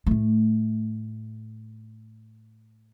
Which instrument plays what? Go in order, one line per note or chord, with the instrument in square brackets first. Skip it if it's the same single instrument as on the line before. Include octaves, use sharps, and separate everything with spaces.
[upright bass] A2 A3